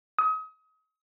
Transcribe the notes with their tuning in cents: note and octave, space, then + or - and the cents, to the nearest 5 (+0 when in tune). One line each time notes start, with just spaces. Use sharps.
D#6 +35